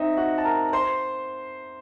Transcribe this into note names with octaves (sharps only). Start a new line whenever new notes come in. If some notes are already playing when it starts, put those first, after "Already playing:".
Already playing: C4 D#4 D#5 E5
F#4 F#5
A5
A#4 A#5
C5 C6